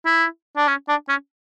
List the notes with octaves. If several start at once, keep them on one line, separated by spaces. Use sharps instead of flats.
E4
D4
C#4
D4
C#4